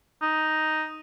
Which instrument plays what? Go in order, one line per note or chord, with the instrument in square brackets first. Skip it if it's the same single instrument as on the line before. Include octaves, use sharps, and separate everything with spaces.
[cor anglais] D#4